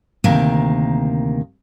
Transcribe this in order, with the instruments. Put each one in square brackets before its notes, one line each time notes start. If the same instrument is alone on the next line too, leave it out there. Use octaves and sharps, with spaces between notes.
[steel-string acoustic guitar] D2 C3 D#3 A#3